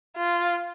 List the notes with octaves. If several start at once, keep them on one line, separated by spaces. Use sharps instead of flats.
F4